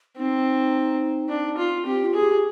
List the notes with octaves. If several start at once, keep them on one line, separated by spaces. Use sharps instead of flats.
C4 D#4
D4
F4
C4 G4
F4
G#4
G4